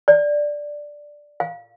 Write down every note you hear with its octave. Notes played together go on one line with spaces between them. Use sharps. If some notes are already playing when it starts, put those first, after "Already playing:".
D5
F5